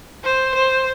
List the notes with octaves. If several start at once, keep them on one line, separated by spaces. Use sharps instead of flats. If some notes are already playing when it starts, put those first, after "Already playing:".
C5
C5